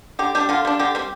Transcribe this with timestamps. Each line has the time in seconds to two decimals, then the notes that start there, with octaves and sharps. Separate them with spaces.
0.19 D3 G4
0.35 G3 D4 G4
0.49 D3 F4
0.65 G3 D4
0.79 D3 G4
0.95 G3 C4